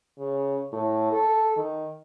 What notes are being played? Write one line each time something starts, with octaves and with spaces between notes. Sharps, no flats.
C#3
A2
A4
D#3